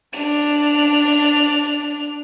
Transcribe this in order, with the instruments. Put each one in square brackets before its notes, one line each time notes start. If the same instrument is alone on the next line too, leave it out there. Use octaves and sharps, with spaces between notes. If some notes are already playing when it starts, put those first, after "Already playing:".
[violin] D4 F7